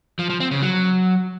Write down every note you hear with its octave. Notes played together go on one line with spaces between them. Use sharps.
F3
F3
C4
C#3
F#3